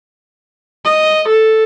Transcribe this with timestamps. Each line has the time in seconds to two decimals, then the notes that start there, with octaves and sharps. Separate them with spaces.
0.85 D#5
1.28 A4